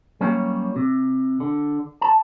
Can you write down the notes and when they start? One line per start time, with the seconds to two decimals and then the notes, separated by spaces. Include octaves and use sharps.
0.21 F#3 G3 A#3 C#4
0.76 C3
1.40 D3
2.02 A5